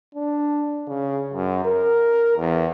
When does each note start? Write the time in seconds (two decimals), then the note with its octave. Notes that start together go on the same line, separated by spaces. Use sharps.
0.15 D4
0.88 C#3
1.34 F#2
1.65 A#4
2.37 E2